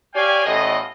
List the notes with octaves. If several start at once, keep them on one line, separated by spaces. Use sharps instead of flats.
G4 C#5 D5 F5 G5 G#5
A1 E2 A2 F4 D#5